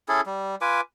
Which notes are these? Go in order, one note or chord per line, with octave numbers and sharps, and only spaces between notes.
C#4 E4 G#4 A4
G3
F4 B4 G#5 D6